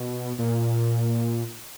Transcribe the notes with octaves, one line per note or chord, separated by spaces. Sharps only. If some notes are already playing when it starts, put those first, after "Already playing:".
Already playing: B2
A#2